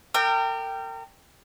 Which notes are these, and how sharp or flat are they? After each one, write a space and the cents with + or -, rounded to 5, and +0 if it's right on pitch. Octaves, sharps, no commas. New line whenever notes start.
A#4 -40 G5 -5 D6 +30